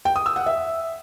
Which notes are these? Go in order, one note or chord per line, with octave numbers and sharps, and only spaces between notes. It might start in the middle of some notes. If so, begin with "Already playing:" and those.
G5
D#6
E6
F#5
E5